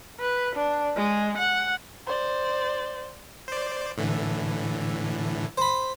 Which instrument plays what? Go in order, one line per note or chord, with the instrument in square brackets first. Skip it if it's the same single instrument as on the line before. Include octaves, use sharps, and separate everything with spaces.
[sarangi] B4
D4
G#3
F#5
[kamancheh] C5 D5
[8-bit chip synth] C5 D5
A2 D3 E3
[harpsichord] C5 B5